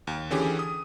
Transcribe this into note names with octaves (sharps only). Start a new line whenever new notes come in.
D#2
D3 E3 C#4 G4 G#4
D#6